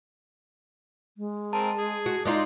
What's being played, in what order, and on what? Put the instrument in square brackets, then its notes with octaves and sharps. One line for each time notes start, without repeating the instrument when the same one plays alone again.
[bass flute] G#3
[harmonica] C4 A#4 [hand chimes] A5
[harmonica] G#4
[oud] F#4
[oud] G#3 D#4 F4 [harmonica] D5